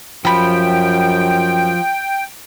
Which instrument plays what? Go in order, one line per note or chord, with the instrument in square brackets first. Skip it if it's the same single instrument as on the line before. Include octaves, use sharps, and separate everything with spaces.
[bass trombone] F#2 [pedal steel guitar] F3 [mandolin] G4 B5 [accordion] G5